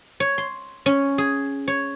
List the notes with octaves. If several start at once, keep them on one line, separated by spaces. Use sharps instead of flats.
C#5
C6
C#4
G#4
C#5